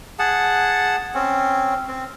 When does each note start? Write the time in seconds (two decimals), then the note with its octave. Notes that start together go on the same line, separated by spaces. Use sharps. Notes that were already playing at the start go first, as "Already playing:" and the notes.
0.19 G#4 F#5 A5
1.14 C4 C#4
1.88 C4